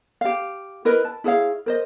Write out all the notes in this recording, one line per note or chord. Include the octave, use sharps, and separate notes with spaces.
G4 F5
E4 A#4 B4 D#5
A5
E4 G#4 C#5 F5
A#4 C5 D#5